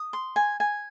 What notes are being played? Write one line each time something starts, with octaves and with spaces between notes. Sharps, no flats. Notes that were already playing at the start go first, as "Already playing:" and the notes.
Already playing: D#6
C6
G#5
G#5